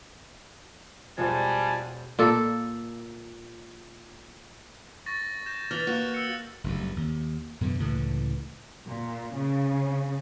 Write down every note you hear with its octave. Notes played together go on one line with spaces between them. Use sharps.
E1 F3 G3 G#3 C5 G#5 A5
A#2 A4
C#6 A6 A#6
G6 A#6 E7
E3 F6 A6 F7
A#3 F#4 F#6
E6 C#7
F#1 D2 G2
D#2
F#2 B2 D3 E3
C#2 A2 D3 E3
A#2
C#3